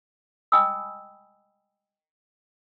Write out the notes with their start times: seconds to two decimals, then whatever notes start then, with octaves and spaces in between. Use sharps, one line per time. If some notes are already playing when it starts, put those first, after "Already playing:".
0.52 D#5 G5 G#5 B5 D#6 E6